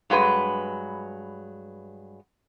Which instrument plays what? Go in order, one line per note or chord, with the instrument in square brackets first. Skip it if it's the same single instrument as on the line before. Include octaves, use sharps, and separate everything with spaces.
[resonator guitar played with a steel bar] G2 F#3 G#3 B4